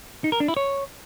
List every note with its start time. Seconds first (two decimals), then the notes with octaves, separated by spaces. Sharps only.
0.24 D#4
0.32 A#4
0.40 D4
0.48 E4
0.57 C#5